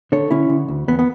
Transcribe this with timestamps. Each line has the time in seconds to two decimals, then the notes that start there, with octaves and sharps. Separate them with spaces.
0.12 D3 A4 C#5
0.31 D3 C#4 E4
0.50 D3
0.68 D2
0.88 E2 B3
0.99 B3